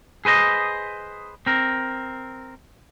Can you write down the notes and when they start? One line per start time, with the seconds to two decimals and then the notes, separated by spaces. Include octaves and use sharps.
0.25 G#4 B4 C5 D#5
1.46 C4 A#4